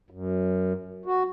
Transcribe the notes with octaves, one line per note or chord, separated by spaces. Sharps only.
F#2
F#4